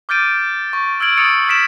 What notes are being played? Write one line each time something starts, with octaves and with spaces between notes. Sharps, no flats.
D6 F6 G6 A6 D7 D#7
C#6
E6 F6 G#6 D7 F#7
D#6 E6 A6 C#7 D#7
F6 B6 D7 E7